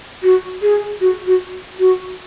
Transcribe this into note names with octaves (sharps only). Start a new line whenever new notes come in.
F#4
G#4
F#4
F#4
F#4